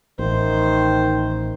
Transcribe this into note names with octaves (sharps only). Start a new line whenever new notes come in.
A1 D#3 C5